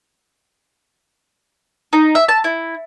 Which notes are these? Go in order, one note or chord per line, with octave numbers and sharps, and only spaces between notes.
D#4
E5
A5
E4